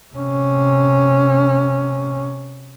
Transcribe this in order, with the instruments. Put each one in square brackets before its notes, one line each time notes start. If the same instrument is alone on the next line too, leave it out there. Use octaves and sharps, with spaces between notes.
[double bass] C3 C#4